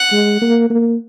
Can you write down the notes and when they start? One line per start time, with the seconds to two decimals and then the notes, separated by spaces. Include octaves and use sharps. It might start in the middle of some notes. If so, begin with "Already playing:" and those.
Already playing: F#5
0.12 G#3
0.42 A#3
0.70 A#3